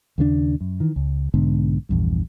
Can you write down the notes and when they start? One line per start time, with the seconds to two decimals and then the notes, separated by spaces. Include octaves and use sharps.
0.18 D#2 C#3 G#3 D4
0.61 F#2
0.80 D#3 E3
0.96 C#2
1.34 B1 G#2 D3 B3
1.89 A#1 E2 G2